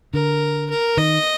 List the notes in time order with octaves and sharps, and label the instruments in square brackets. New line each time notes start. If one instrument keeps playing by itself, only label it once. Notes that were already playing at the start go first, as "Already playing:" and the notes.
[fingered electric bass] D3 [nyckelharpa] A#4
[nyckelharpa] A#4
[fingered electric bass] D#3 [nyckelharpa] D#5